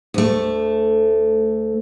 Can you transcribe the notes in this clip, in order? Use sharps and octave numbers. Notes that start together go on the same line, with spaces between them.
D2 A3